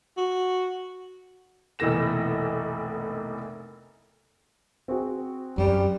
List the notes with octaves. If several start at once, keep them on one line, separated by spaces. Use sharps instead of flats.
F#4
F1 B1 E3 A#3 A#6 E7
C4 F#4 G#4
F#2 G3